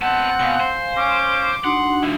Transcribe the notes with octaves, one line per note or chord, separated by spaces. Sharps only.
B3 C4 F#5 A5
B2 F5 G#5
C5
C#4 D6
D4 D#4 F#4 F#5 C6
F3 E4